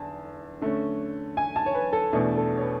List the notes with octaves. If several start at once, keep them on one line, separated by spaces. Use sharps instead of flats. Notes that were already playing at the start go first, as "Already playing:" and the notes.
Already playing: E2 D3 A5
D3 A3 C#4
G#5
A5
C#5
B4
A4
E2 B2 A3 D4
A4
C#5
B4